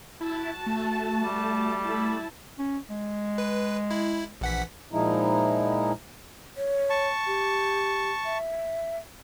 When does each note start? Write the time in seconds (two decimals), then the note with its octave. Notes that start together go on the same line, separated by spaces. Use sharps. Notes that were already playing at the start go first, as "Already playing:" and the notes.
0.21 E4 F#4 A5
0.66 A3
1.20 G3
1.82 E4 A5
2.59 C#4
2.90 G#3
3.38 B4
3.91 E4
4.41 A#1 E3 F#5 B6
4.93 A#2 F3 G#3 D#4 E4
6.57 C#5
6.90 A5 C#6
7.27 G4
8.25 E5